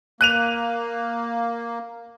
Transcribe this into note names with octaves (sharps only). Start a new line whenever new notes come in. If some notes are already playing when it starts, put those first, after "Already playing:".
A#3 F#6 D#7 F7